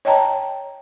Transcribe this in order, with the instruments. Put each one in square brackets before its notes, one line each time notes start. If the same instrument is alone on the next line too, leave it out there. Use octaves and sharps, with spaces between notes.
[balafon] C#5 D#5 G5 A5 A#5